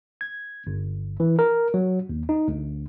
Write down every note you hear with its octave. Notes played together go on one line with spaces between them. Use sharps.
G#6
G1
E3
A#4
F#3
D#2
D#4
D2